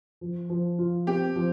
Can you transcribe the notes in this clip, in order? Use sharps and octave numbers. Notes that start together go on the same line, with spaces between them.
F3
F3
F4
C4 G4
F3